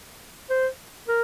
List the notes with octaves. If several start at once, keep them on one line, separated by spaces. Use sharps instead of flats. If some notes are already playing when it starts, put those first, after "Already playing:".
C5
A#4